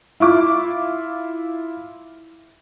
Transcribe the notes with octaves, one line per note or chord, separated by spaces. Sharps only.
E4 F4 D6